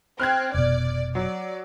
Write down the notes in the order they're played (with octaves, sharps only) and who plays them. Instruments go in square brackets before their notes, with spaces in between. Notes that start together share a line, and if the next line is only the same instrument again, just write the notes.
[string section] C4 [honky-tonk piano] F6 F#6 G#6
[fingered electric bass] F1 B2 [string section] D5
[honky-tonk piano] F#3 [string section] D5